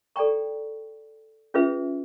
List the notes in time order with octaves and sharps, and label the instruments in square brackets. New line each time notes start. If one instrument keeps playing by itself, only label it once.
[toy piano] A4 D5 G5 A#5 C#6
C#4 F4 G#4 B4 E5